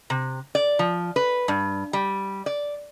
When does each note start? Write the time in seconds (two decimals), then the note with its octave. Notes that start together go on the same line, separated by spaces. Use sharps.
0.10 C3
0.55 D5
0.79 F3
1.16 B4
1.48 G2
1.93 G3
2.46 D5